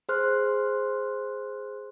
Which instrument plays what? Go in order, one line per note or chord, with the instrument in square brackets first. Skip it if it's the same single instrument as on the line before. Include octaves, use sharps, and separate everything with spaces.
[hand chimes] G#4 C5 C6 F6 F#6